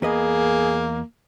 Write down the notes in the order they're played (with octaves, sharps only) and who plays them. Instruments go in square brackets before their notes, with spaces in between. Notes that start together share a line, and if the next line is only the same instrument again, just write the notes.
[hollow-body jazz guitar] E2 B4 D#5 [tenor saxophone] A#3 [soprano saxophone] G#4